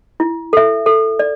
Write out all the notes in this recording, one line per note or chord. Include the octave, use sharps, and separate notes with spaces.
E4
A4 E5
A4
D5